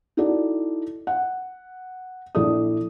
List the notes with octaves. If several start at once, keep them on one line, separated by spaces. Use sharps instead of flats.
D#4 E4 F#4 A4 D5
F#5
A#1 E4 A4 D5 D#6